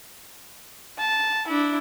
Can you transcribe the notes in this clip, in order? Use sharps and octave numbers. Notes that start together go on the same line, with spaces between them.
A5
D4 E4